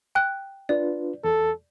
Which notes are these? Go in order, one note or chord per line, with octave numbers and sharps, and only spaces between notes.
G5 F#6
D4 F4 B4 D5
E2 A4